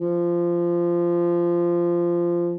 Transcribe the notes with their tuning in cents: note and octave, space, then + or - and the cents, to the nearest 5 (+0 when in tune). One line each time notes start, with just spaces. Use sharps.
F3 -15